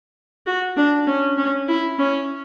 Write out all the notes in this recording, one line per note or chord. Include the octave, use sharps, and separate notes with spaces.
F#4
D4
C#4
C#4
E4
C#4